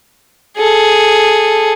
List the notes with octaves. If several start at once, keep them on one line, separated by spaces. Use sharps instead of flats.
G#4 A4